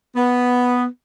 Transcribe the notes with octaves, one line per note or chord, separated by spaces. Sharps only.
B3